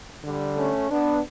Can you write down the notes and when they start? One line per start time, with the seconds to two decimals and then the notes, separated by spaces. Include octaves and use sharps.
0.24 D3 G3
0.57 A3 C#4
0.90 B3 D4